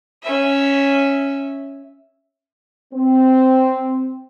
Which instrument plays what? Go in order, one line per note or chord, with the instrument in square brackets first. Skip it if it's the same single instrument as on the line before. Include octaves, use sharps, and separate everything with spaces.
[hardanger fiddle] C#4 E5
[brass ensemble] C4